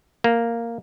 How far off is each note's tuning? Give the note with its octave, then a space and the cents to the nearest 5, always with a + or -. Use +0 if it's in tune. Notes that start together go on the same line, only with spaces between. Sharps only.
A#3 -5